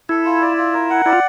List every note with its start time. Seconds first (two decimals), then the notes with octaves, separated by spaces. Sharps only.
0.09 E4 A4
0.25 F4
0.41 D5
0.57 F4
0.73 A#4
0.90 F#5
1.06 E4 D5
1.13 F4